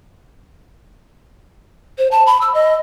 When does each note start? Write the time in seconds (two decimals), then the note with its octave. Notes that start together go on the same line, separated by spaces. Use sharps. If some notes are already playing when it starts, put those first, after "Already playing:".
1.98 C5
2.11 A5
2.26 B5
2.41 E6
2.54 D#5